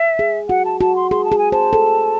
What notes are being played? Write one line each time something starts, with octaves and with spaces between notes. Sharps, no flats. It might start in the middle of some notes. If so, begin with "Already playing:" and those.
Already playing: E5
G#4
F#4 F#5
A5
F#4 A5
C6
G#4 C6
A5
G#4
G#5
C5 A5
A4